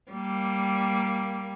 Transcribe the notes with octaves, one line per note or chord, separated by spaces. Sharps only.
G3 A#3